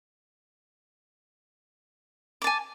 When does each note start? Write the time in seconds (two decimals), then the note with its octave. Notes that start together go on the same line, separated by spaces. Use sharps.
2.42 D6
2.44 A5
2.47 G#5